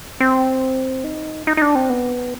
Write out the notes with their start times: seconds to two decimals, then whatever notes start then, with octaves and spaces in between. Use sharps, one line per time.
0.20 C4
1.04 D#4
1.47 D#4
1.57 D#4
1.62 D4
1.75 C4
1.90 B3